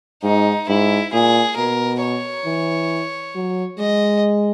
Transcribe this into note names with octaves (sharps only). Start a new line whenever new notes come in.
G#2 D#4
G#2 E4
A#2 G#4
B2 A#4
C#5
E3
F#3
G#3 D#5